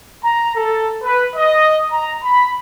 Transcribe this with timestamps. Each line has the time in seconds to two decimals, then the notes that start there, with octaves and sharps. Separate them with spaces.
0.22 A#5
0.55 A4
1.02 B4
1.36 D#5
1.91 A#5
2.23 B5